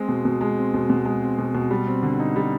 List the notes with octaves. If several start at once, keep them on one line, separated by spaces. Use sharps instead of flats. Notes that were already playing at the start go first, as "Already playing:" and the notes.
Already playing: G#3 C4
B2
B2
G#3
C4
B2
B2
G#3
C4
B2
B2
G3
C4
D3
D#4
G3